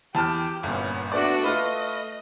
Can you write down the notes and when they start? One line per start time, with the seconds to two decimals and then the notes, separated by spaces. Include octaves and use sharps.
0.15 E2 G4 A5 F6
0.63 G1 A#2 B3 C#4
1.12 A3 B3 D4 F#4 D5
1.44 A3 F4 B4 D#5